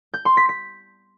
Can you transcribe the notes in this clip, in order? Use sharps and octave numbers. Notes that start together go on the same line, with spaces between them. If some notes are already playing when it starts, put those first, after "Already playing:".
G6
C6
B6
B6